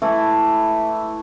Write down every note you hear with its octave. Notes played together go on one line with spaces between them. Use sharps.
E3 A3 E4